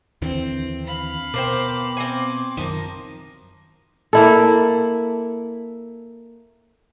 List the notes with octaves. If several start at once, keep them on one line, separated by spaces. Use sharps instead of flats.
D#2 D3 E3 C4
F5 B5
B2 A#4 C5 G5 D6
C4 G#5 D6
F#2 D#3 F3 A#4
A#3 E4 A4